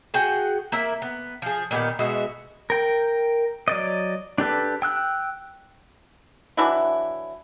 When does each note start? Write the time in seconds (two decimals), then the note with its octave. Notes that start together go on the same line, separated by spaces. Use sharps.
0.14 F#4 G#4 F#5 G5
0.72 A#3 E4 E5
1.02 B3
1.42 F3 G#4
1.71 A#2 D#3 B3 G4
1.99 B2 G#3 F#4 E5
2.70 A#4 G5
3.68 F#3 D5 D#5
4.38 D4 G4 A4 B4
4.82 G5 E6 F#6
6.57 E3 F#3 D4 E4